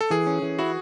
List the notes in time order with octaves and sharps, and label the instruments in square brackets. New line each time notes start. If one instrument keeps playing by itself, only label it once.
[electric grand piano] A4
[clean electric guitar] E3 [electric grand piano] G#4
[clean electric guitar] C#4
E3
[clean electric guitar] E4 [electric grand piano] F#4